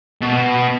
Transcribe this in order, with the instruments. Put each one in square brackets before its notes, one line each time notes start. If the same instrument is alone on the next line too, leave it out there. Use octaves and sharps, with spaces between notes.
[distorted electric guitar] B2